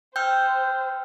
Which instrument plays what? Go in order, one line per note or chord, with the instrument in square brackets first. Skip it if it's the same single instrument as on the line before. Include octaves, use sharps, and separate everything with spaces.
[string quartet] C5 [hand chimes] G5 E6 F6 [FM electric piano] G6